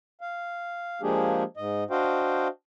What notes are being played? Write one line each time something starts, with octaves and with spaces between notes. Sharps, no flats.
F5
F3 G#3 A#3 D4 G4 G#4
G#2 D#5
D4 F#4 C5 D#5 F5 G5